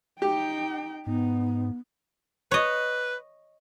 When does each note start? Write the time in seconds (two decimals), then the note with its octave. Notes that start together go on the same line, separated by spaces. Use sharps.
0.22 D#4 G4 G5
1.07 G#2 B3 D#4
2.51 B4 C#5 D#5